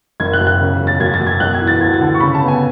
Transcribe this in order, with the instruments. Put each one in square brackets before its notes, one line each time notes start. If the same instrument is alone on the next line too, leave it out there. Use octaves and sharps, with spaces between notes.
[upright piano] F#1 G#6
F#6
F#2
F#6
C#3
E1
A6
F#2 G#6
A6
F#2
G#6
B1 F#6
G#6
E3
A6
D2 G#6
A6
D3
C#6
C#3 B5
A5
B3
G#5